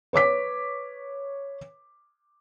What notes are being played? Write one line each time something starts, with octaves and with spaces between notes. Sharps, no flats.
B4 C#5 D6 B6